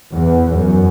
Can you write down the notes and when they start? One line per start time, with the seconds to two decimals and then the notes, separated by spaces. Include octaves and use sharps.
0.14 E2
0.58 F#2